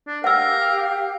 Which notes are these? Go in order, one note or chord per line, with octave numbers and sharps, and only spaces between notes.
D4
G4 A#4 F5 F#5 E6